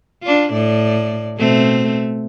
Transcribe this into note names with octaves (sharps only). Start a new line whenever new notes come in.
D4 F4
A2 D5
B2 A3 C4